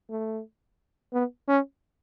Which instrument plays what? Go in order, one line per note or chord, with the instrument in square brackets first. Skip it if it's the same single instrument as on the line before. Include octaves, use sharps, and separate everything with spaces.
[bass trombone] A3
B3
C#4